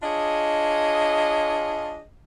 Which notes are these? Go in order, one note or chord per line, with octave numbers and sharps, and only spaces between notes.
D4 F4 G#4 C#5 D#5